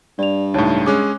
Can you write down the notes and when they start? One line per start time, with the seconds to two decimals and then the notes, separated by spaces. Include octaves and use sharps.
0.19 G2 D5 F7
0.54 C#2 A2 D#4 C#5 A5
0.86 G#3 C#4 G#4 D6 F#6